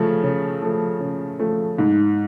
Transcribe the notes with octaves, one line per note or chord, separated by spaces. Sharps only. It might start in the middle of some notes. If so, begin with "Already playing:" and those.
Already playing: C#3 F3 A3
C#3
F3 A3
C#3
F3 A3
G#2